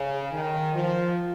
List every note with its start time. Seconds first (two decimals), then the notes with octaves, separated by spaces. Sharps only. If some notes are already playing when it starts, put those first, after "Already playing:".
Already playing: C#3
0.32 D#3
0.73 F3